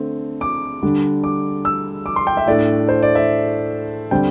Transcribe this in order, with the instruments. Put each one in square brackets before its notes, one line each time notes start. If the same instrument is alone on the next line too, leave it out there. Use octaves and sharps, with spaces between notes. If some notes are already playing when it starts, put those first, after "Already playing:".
Already playing: [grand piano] D3 A3 C4
D6
D3 G3 D4
D6
E6
D6
C6
G5
E5
A2 A3 D4 D5
C5
D5
E5
D3 G3 C4 G5